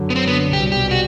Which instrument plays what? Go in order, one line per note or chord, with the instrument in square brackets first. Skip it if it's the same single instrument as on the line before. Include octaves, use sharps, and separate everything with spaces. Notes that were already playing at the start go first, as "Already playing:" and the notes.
Already playing: [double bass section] F#2 D3 F#3
[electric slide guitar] B3
C4
B3
[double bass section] C2 B2 G3 [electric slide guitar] G4
[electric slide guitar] G4
F#4